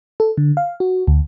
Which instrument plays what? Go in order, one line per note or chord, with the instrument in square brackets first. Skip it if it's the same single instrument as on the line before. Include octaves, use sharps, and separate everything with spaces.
[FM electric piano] A4
D3
F5
F#4
D2